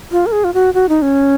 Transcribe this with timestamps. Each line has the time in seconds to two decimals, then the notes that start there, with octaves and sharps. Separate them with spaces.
0.12 F4
0.26 A#4
0.32 G#4
0.44 F4
0.54 F#4
0.74 F#4
0.89 D#4
1.02 C#4